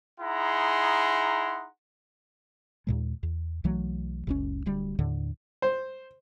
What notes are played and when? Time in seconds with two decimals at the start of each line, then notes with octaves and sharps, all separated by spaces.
0.20 D#4 E4 G#4 F#5 A#5 C6
2.87 D#2 A#2 G#3
3.23 E2
3.64 B1 E3 F#3 A3
4.27 F#1 C#2 C#4
4.66 D1 D2 G3
4.99 D#2 A2 D3
5.62 C5